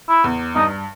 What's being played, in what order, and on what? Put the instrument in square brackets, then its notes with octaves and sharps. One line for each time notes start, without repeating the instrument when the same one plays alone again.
[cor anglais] E4
[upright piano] E2
[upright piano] G2 [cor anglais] D#4